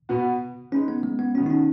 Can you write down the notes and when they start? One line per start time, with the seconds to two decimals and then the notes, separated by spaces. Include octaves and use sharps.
0.09 B2 B3 F#4 B4
0.72 G#3 C#4 D#4 B4
0.88 B3
1.03 G#3
1.19 B3
1.35 D#3 B3 C#4 F#4
1.46 D#4
1.50 C#4